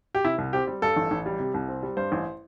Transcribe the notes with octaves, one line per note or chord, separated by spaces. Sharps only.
G4
C3 E4
C2
C4 G4
G3
G2 A4
A1
A1
G3
C3
C2
C4
G3
G2 C5
A1